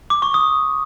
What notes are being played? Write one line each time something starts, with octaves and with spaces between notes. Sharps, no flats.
D6
C#6
D#6